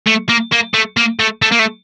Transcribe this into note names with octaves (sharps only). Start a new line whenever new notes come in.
A3
A#3
A#3
A3
A#3
A3
A3
A#3
A3